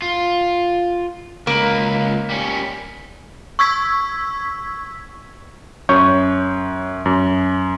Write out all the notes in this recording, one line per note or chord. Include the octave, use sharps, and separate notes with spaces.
F4
C#2 A#3 B4
G3 C#4
C#6 E6 G#6 B6
F#2 C#5 C#6 G6
F#2